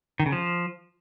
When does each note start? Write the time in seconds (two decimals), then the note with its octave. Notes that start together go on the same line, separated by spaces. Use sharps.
0.20 D#3
0.26 C#3
0.32 F3